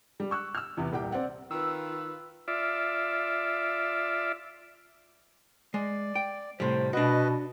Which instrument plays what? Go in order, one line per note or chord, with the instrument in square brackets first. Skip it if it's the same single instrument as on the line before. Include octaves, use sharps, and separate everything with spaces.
[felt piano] G3
C#6 E6 F#6
E6 F6
E2 C3 B3
D#1 C2 G4 F#5 G5
C4 D5 F#5
[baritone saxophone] D#3 [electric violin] F4 B4 [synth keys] E6
[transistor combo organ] F4 D5 E5
[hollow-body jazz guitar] G#3 [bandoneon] D5
[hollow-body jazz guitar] G5
[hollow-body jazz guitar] A2 C3 G3 [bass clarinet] C5
[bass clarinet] B2 [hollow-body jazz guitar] D4 F#4 [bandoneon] B4 D#5